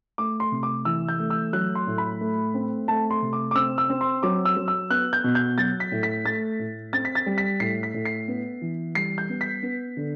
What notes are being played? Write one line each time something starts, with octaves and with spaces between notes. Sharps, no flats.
A3 D6
C6
C3
D6
E3 E6
G6
A3
E6
F#3 F#6
C6
A2
B5
A3
C4
A3 A5
C6
C3
D6
D6
C4 E6
E6
C4
C6
F#3 D6
E6
F#3
E6
B3 F#6
G6
B2
G6
F#3 A6
B6
A2
B6
A3 A6
A2
C4 A6
B6
A6
G3
B6
A2 C7
B6
A2
C7
B3
E3
G3 C7
G6
B3
B6
B3
D3